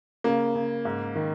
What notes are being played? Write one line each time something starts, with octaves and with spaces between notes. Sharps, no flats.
C#3 A#3
C#3
G#2
D#3